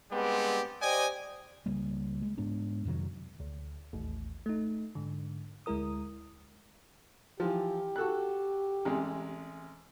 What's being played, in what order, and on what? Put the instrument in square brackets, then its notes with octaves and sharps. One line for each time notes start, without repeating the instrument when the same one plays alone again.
[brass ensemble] G3 G#3 B3 C4 D4 G4
G4 C5 D5 D#5 G5 G#5
[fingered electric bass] C#2 G3 A#3
G#3
G#2 G#3 B3 D4
F2 C3 D#3 F#3
[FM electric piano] D2
A1 D#2 A2
A3 D#4
G#2 D3
D2 G#3 E4 A#4 D#6
[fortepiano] E3 F3 [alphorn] G4
[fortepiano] F#4 A4 F#6
A1 C3 G#3